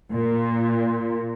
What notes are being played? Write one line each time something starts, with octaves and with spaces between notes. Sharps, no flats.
A#2